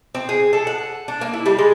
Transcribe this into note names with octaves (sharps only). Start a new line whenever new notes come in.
C4
G#4
A4
F#5
D4
A#3
E4
G3
G#3